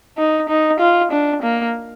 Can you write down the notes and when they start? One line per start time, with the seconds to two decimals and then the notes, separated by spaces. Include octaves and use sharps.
0.18 D#4
0.49 D#4
0.80 F4
1.11 D4
1.43 A#3